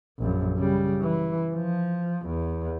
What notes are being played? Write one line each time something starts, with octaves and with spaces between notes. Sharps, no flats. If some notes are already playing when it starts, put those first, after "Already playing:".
A#1 F#2
C#3 G3
E3
F3
E2